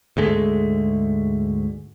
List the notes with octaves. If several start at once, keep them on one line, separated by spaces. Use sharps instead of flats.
D2 G#2 G#3 A3